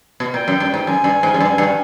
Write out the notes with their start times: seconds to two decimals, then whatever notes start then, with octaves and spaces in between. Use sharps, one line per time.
0.20 B2
0.34 A#2 G5
0.48 F#2
0.60 G2
0.74 G#2
0.87 F#2 G#5
1.04 G2
1.23 G#2
1.34 F#2
1.40 G2
1.58 G2